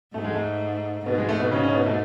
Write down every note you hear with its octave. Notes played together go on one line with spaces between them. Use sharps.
G#2 A3
G#3
A3
G#2 B2 B3
G#3
A3
B2 B3
C#3 C#4
C#3 C#4
B2 B3
A3